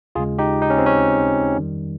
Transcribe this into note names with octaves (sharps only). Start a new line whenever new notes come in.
D#2 C#3 G#3 F4 G#4
D#4 G4
D#4
C#4
C4
C#4
F2 D#3 G3